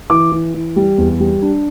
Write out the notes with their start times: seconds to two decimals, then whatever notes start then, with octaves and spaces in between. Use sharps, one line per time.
0.10 E3 D6
0.32 E3
0.54 E3
0.76 G3
0.98 E2
1.20 G3
1.42 D4